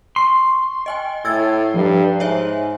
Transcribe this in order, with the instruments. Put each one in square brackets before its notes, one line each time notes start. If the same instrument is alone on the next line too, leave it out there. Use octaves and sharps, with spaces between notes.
[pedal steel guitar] C6 [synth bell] C#6
[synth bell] D#5 G5 G#5
[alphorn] A2 [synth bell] E6 G#6 A6
[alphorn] G2 [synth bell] F3
[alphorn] G#2 [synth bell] C#5 E5 G#5